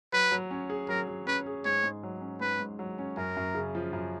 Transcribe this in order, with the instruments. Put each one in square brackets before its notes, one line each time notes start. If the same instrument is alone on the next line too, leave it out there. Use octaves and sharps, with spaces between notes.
[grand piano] F#3 [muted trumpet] B4
[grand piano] F#3
C#4
G#4
[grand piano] F#3 [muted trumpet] A#4
[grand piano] F#3
[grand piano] C#4 [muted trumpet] B4
[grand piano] G#4
[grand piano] G#2 [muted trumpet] C#5
[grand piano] G#2
F#3
C#4
[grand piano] G#2 [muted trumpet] B4
[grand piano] G#2
F#3
C#4
[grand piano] F#2 [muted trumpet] A#4
[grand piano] F#2
C#3
F3
F#2